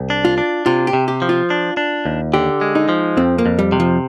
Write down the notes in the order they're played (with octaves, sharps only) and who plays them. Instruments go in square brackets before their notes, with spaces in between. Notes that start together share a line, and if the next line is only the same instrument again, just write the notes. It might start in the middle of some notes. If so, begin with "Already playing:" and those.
Already playing: [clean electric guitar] C2
D4
[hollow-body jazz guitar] F4
[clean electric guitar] D4
[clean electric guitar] C3 [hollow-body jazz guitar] F4
[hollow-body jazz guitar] G4
[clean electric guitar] C3
[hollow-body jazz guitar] G4
[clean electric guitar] F3
[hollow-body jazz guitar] F4
[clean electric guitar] D4
D4
D#2
[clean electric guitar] D3 [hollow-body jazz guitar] G4
[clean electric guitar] G#3
[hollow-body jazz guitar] D#4
[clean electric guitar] F3
[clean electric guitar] F2 [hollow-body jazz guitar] C4
[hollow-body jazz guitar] A#3
[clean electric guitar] F2
[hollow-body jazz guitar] G3
[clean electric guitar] C3
[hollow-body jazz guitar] F3